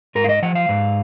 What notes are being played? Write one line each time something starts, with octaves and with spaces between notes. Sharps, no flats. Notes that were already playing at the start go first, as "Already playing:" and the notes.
G#2 A#4
F5
D#5
F3 F#5
F5
G#2